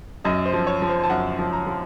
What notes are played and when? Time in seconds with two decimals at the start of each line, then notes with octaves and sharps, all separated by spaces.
0.24 F#2 D#5
0.46 C5
0.54 F3
0.67 C#5
0.82 F3
0.89 C5
1.04 A5
1.10 F#2 F#5
1.39 F3
1.53 A#5
1.67 F3